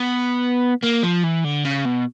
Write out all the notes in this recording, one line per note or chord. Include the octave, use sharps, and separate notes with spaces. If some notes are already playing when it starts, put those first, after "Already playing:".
Already playing: B3
A#3
F3
E3
D3
C#3
B2